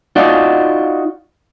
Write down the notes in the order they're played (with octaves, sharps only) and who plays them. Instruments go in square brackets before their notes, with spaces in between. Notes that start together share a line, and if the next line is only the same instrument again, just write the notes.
[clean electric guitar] D#4 F4 F#4 D5